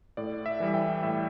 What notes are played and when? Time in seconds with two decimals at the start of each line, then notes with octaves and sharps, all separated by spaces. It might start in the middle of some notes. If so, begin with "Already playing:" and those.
0.17 A2 D5
0.46 E5
0.60 E3 G3
0.74 E5 G5
1.03 A2 E5